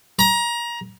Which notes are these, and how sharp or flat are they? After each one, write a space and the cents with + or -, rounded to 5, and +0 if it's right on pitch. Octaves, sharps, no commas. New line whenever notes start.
A#5 +25